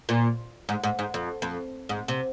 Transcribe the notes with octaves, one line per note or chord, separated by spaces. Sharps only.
A#2
G#2
G#2
G#2
F2
F2
G#2
C3